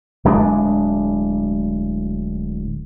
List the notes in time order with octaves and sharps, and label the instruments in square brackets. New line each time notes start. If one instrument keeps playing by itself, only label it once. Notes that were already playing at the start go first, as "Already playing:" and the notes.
[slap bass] D1 G#3 B3 D4